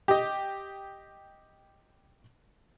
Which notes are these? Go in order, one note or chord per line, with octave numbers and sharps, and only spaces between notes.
G4 D#5